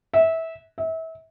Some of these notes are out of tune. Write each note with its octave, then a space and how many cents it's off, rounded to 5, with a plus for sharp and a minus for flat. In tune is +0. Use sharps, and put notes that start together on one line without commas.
E5 -20
E5 -30